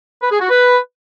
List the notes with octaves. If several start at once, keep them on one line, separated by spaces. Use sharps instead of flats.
B4
G#4
F#4
B4